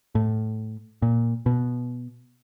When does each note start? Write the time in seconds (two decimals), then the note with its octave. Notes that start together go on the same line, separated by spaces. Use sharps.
0.15 A2
1.02 A#2
1.46 B2